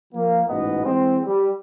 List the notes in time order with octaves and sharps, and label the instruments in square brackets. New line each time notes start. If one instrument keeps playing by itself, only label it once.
[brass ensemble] F3 A#3
A1 G#2 B2 B3 D#5
E3 G#3 C4
G3